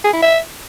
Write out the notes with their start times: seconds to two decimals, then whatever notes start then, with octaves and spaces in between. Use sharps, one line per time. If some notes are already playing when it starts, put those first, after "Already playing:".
0.04 G#4
0.13 E4
0.22 E5